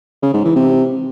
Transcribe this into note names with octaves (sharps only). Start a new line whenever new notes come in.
C#3
G#2
E3
C3